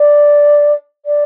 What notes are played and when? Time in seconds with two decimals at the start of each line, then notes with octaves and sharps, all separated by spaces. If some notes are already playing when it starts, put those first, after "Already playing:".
Already playing: D5
1.05 D5